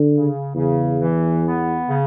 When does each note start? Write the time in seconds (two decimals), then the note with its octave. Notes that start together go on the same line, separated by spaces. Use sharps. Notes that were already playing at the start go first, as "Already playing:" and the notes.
Already playing: D3
0.11 C#3
0.55 E2 C#3
1.00 E3
1.45 B3
1.90 C#3